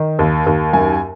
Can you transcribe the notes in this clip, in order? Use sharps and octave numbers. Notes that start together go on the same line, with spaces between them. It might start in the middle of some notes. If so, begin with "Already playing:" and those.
Already playing: D#3
D#2
D#2
F#2 G#5